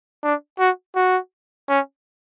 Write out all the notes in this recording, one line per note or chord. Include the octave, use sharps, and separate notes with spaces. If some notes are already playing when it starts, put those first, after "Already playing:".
D4
F#4
F#4
C#4